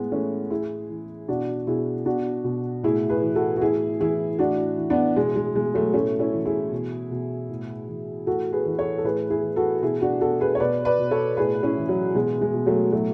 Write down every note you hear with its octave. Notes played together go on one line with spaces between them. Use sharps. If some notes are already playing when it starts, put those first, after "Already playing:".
Already playing: A2 G#3 B3
E3 A3 C#4
A2 E4 G#4
E3
B2 D4 F#4
B2 E4 G#4
B2 D4 F#4
B2
A2 E4 G#4
G#4 B4
E3
F#4 A4
F#4
A2 E4 G#4
E3 E4 G#4
A2 D4 F#4
E3
B3 D4
B2 G#3
G#3
B2 G#3
F#3 A3
A2 A3 C#4
C#4 E4
E3
E4 G#4
B2
B2
A2
E3
A2 F#4 A4
G#4 B4
E3
A4 C#5
A4
A2 G#4 B4
E4 G#4
E3
F#4 A4
B2 E4 G#4
D4 F#4
B2 F#4 A4
G#4 B4
C#5
B2 B4 D5
B4 D5
B2
A4 C#5
A2 G#4 B4
C#4 E4
E3
F#3
B2 G#3
G#3
B2
F#3 A3
A2 F#3 A3